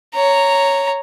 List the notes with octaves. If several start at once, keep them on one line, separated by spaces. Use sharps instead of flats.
C#5 A#5